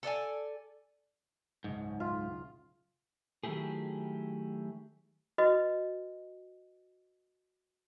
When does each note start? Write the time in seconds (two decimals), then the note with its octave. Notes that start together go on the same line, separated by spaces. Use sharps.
0.03 A4 D5 D#5 G#5
1.64 F#1 C#2 G#2 B2
2.00 F4 E5
3.44 D#3 F#3 A3 E4 G4 G#4
5.38 F#4 B4 D#5